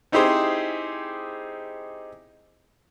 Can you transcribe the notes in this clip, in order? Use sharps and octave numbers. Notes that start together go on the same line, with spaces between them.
C4 D#4 E4 G4 G#4 C5